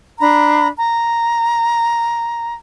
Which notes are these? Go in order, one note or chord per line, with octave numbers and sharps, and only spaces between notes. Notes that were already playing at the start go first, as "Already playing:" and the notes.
D4 A#5 B5
A#5